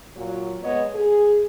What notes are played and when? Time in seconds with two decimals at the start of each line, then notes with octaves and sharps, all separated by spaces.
0.15 A#2 F#3
0.62 G#3 B3 C#5 D#5
0.95 G#4